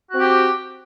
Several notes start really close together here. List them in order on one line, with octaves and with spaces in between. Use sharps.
F#4 C4 G4